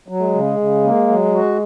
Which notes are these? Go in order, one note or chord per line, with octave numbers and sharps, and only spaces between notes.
F#3
G#3
C#3
C#3
A#3
F#3
F#4